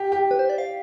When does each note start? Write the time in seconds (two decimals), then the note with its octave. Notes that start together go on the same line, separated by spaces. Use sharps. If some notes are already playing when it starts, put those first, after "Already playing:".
Already playing: G4
0.12 G4
0.31 B4
0.39 C5
0.49 D5
0.58 F5